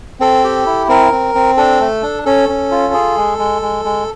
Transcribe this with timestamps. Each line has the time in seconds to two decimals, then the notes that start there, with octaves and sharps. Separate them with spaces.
0.20 C4 A4
0.44 G4
0.66 E4
0.89 C4 A#4
1.12 C4
1.35 C4
1.57 D4 A4
1.81 A3
2.03 D4
2.26 C#4 A4
2.49 C#4
2.71 F4
2.94 G#4
3.17 G#3
3.39 G#3
3.62 G#3
3.85 G#3